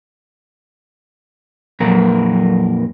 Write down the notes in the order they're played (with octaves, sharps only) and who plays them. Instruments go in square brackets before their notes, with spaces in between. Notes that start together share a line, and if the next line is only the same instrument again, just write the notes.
[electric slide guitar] F2 A#2 A#4 [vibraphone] F#3